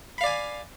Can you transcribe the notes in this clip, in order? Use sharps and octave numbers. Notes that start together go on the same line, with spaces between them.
D5 F5 G#5 B5